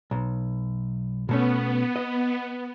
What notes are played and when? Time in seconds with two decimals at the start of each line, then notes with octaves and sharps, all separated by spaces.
0.11 B1
1.29 B2 A3 B3 C#4
1.96 D#5